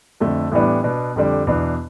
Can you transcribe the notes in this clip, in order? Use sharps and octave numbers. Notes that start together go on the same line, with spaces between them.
F2 D3 A3
A2 E3 G3 B3 D4
B2 B3 D4
F2 D3 G3 D4
E2 B2 B3 D4